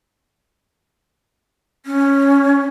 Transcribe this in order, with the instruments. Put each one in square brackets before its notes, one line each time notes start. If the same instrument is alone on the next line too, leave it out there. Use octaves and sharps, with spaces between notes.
[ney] C#4